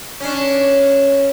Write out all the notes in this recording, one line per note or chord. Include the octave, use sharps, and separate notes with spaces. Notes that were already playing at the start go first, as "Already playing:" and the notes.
C#4 D4